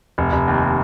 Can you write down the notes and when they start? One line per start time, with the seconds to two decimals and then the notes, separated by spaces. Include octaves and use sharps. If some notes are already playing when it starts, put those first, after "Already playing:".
0.18 F1
0.32 F1
0.48 D#2